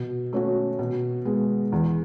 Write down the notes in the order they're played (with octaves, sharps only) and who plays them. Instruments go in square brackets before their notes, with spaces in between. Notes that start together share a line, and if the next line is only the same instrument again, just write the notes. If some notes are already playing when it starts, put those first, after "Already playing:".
Already playing: [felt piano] B2
A3 C#4 F#4
B2
G#3 B3
E2